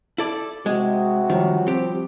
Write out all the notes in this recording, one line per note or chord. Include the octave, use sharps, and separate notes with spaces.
E4 A4 D5
C3 G#3 F#4
D#3 F3 G3 C#5
C4 G4